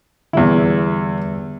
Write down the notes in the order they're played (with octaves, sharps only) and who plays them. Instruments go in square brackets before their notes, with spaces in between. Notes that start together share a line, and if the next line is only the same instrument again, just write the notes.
[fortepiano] E2 E4 [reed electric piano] D3 G3 B3